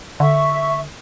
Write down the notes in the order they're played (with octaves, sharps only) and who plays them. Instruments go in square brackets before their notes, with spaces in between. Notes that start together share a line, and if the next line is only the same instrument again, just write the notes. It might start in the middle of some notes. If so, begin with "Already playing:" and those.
[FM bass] D3 [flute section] E5 C#6